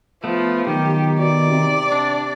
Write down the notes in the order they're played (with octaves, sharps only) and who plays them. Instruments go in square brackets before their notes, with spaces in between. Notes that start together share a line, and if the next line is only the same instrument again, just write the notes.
[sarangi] F3 [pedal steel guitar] A3 B3
[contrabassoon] B1 [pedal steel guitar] D#3 [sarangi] G4
[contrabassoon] B2 [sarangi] D5
[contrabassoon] C3
[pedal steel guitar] D4